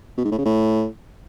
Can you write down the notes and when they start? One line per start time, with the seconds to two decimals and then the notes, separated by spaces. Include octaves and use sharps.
0.17 B2
0.24 G#2
0.31 A2
0.38 C#3
0.45 A2